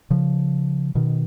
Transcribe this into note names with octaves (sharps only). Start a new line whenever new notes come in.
C#3 F3
B2 D#3